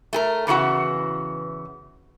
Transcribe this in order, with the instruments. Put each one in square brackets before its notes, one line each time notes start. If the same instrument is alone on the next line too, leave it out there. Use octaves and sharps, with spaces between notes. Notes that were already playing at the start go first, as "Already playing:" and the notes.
[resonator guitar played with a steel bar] A3 G#4 A#4
E2 C#3 E3 F#4 F#5